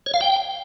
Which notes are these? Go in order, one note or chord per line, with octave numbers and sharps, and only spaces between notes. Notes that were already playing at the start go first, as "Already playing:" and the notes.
C#5
F5
G5